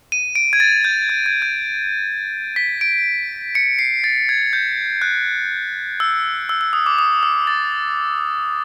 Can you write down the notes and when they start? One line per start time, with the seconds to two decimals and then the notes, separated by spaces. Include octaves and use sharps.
0.12 D#7
0.35 D7
0.53 G#6
0.60 A6
0.84 G6
1.09 G#6
1.26 G#6
1.42 G6
2.56 B6
2.81 D7
3.55 C#7
3.79 C7
4.04 A6
4.29 G#6
4.53 G6
5.02 F#6
6.00 E6
6.49 E6
6.61 E6
6.73 D#6
6.86 D6
6.99 D#6
7.23 E6
7.47 A6